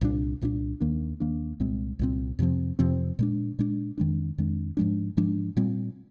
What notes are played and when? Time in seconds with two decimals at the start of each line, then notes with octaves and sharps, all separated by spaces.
0.01 C2 A#2 G3 D4
0.41 C2 A#2 G3 D4
0.80 D#2 D#3 A#3 D4
1.20 D#2 D#3 A#3 D4
1.60 C2 A#2 G#3 C4
1.99 C2 A#2 G#3 C4
2.39 F2 C3 F3 C4
2.79 F2 C3 F3 C4
3.19 A#2 G#3 D4
3.59 A#2 G#3 D4
3.98 F2 D#3 G#3 D4
4.38 F2 D#3 G#3 D4
4.77 G#2 F3 G#3 D4
5.17 G#2 F3 G#3 D4
5.57 A#2 G3 C4